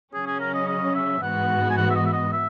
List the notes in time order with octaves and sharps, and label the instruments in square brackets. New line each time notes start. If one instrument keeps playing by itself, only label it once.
[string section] C#3 F#3 C#4 [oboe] G#4
[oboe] G#4
A#4
D#5
D#5
E5
[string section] G#2 E3 B3 F#4 [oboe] F#5
[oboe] G#5
F#5
E5
D#5
E5
D#5
E5